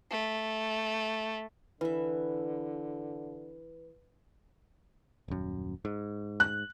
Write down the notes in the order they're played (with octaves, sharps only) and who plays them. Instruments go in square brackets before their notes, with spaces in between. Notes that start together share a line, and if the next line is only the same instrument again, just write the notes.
[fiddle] A3
[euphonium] D3 [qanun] E3 E5 [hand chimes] B4
[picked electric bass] D#1 F#2
G#2
[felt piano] F#6